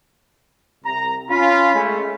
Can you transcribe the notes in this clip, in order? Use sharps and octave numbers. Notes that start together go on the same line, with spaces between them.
C2 A#5
C#4 F4 B5
G#3 A3 C#4